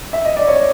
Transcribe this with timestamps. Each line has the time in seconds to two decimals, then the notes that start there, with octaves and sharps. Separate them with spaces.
0.13 E5
0.25 D#5
0.37 D5
0.48 C#5